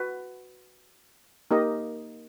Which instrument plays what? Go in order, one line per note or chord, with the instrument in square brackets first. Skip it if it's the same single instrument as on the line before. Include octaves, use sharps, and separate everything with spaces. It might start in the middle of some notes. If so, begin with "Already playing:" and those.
Already playing: [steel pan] F#4 B4
A#3 D#4 G4 A#4 D#5